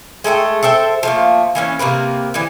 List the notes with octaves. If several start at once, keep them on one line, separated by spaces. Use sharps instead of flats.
G#3 A3 A4 G5
A4 C5 E5 G5
F3 A3 A#3
E3 A#3 C#4
C3 A#3 A#4 B4
D3 E3